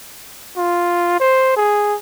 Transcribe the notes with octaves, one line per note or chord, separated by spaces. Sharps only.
F4
C5
G#4